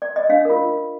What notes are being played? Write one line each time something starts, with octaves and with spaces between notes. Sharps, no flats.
D5
D#5
D4 F5
F4 A#4